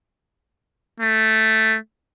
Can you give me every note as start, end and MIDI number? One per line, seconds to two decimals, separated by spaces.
1.00 1.77 57